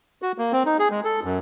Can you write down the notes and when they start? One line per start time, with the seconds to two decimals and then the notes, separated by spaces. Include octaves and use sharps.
0.22 F#4
0.38 A#3
0.52 C4
0.66 D#4
0.79 G#4
0.91 G#3
1.05 A4
1.24 F#2